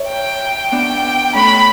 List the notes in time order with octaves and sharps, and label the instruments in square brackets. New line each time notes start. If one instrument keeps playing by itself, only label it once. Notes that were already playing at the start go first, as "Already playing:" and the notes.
Already playing: [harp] C#5 E5
[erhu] G5
[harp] B3 D4 [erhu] G5
[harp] A3 C#4 [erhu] B5